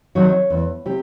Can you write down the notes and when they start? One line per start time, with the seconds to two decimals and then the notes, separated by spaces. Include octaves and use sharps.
0.15 C3 D#3 F#3 C#5
0.50 E2
0.86 C3 G4